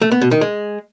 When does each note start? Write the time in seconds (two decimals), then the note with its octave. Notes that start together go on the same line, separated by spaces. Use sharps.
0.02 A3
0.11 B3
0.21 B2
0.31 D#3
0.41 G#3